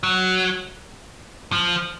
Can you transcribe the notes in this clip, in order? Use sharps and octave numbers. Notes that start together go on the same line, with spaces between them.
F#3
F3